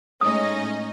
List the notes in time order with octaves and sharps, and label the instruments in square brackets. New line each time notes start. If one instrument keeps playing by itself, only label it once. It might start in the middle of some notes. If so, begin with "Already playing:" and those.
[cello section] A2 G#3 [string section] C#4 D#4 D#5 [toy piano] D#6